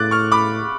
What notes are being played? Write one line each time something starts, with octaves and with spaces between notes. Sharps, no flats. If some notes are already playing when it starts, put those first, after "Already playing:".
Already playing: A2 D6 F#6 A6
C#6 F6
B5 D6